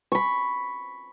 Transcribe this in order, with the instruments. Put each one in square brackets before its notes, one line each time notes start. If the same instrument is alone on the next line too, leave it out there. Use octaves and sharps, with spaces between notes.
[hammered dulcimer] B5 C#6